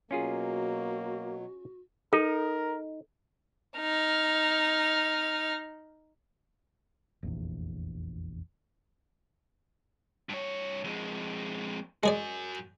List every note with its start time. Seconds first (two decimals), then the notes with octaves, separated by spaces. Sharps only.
0.11 B2 F#3 A#3 C#4 F4 F#4 G#4
2.13 D#4 A4 A#4
3.78 D#4 F6
7.23 F1 A#1 E2
10.29 G2 C#5
10.84 F2 G#3
12.03 G#3 F#4 G#4 D5 G#5